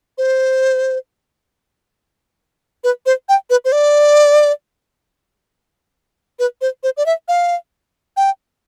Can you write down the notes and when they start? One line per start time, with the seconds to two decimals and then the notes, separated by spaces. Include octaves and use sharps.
0.18 C5
2.84 B4
3.06 C5
3.29 G5
3.50 B4
3.65 C5
3.72 D5
6.39 B4
6.61 C5
6.83 C5
6.97 D5
7.06 E5
7.28 F5
8.17 G5